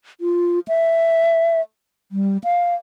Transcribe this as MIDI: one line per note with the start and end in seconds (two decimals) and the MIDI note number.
0.21 0.59 65
0.68 1.61 76
2.12 2.37 55
2.44 2.75 77